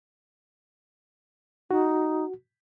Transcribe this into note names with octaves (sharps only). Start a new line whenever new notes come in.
D#4 F#4